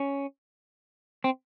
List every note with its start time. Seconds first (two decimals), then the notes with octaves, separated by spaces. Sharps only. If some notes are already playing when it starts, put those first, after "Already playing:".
Already playing: C#4
1.24 C4